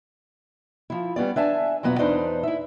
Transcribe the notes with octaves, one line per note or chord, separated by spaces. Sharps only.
F3 E4
G3 B3 C#4 D5
D4 E5 G#5 A5
F2 B2 F#3 B3
E2 D4 D#4 B4 C5
E4 E5